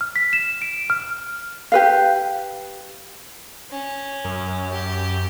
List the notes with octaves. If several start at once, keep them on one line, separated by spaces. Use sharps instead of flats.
F6
B6
E7
D7
F6
G4 B4 F5
C#4
F#2
G4